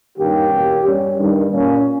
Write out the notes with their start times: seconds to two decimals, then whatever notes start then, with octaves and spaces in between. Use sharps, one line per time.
0.18 G2 D#3 A#3 C#4 G4
0.52 E2 B2 A#3 C#4
0.85 G2 G3 C#4
1.18 G2 D#3 G3
1.51 A#2 A#3 C#4